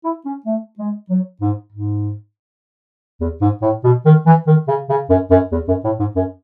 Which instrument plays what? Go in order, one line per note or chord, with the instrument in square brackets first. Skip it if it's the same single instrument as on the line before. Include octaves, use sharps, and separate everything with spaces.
[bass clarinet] E4
C#4
A3
G#3
F#3
G#2
G#2
E2
G#2
A2
B2
D#3
E3
D#3
C#3
C#3
F#2
F#2
E2
F#2
A2
G#2
F#2